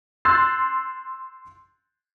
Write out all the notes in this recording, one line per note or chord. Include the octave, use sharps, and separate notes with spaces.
C6 E6 F#6 G6 A6 C7